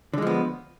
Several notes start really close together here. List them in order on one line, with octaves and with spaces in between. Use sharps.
D3 G#3 F3 B3